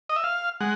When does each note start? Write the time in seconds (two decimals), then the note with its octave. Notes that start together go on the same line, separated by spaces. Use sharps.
0.09 D#5
0.16 E5
0.24 F5
0.61 G#3 F#5